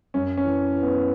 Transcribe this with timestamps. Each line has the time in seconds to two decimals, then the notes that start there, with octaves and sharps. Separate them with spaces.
0.14 F#2 C#4
0.37 C#4
0.44 E3
0.75 E3
0.83 B3